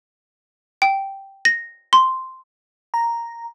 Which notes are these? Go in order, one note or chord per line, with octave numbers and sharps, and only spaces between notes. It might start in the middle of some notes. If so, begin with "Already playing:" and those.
G5
A#6
C6
A#5